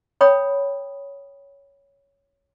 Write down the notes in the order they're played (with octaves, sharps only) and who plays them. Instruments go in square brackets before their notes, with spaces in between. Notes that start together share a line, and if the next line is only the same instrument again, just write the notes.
[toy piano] C#5 G5 B5 D#6